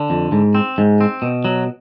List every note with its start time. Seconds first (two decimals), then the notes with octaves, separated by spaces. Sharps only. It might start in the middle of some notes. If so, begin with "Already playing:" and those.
Already playing: D3
0.10 F2
0.32 G#2
0.55 C4
0.78 G#2
1.01 C4
1.22 B2
1.45 F#3